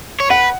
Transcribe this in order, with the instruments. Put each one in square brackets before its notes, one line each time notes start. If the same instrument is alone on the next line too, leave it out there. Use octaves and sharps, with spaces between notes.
[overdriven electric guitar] C#5
[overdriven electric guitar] B4 [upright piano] F#5